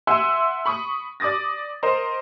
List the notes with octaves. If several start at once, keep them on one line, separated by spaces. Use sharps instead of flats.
E5 F#5 G#5 C6 E6
B5 C#6 D#6
D5 D6 D#6 A6 A#6
A#4 C5 D#5